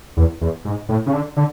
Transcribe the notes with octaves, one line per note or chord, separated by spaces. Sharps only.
E2
E2
G#2
A2
C#3
D3
D3